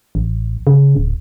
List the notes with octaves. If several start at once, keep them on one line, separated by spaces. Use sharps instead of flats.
A1
C#3
D1